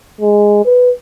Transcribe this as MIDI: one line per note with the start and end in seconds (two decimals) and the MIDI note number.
0.21 0.62 56
0.65 0.91 71